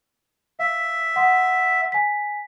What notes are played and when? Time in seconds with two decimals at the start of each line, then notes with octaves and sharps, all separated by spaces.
0.60 E5 F5
1.16 F#5 C6 D#6
1.92 G#5 B6